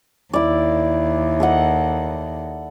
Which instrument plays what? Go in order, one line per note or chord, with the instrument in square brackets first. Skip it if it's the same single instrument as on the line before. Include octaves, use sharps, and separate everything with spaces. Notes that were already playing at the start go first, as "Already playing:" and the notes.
[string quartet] D#2 [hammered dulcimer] E4 D5
[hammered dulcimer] A4 D#5 F#5